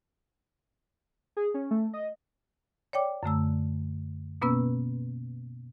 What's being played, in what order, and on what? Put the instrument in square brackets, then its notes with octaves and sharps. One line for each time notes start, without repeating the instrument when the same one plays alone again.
[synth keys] G#4
C#4
A3
D#5
[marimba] C#5 D5 G5 D6
F#2 D3 A3 E6
B2 A#3 B3 C#4 B4 E6